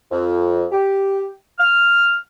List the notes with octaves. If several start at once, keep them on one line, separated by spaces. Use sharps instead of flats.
F2
G4
F6